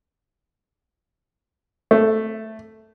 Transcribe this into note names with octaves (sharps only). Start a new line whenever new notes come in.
A3